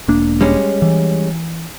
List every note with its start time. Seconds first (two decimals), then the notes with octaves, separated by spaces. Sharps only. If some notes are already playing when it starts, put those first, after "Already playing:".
0.08 E1 A#3 D4
0.41 G3 G#3 C#4
0.82 E3